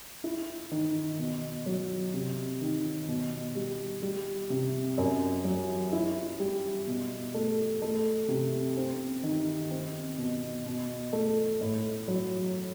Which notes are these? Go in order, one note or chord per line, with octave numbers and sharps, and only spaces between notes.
E4
D#3
B2
F#3
C3
D#3
B2
G3
G3
C3
F#2
F#3
E4
G3
B2
A3
A3
C3
C4
D#3
C4
B2
B2
A3
A2
F#3